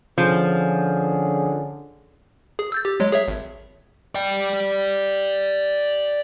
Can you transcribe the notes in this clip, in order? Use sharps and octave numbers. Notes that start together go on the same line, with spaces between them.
D3 F3 C#4 G#4
G#4
E6 G6 A6
G4
F#3 G#3 C#5
G#4 C#5 E5
G#1
D5 G5